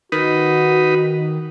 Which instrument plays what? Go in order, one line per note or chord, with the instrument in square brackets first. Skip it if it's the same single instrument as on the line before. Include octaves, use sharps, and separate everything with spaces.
[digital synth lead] D#3 [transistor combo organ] D#4 B4 [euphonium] F#4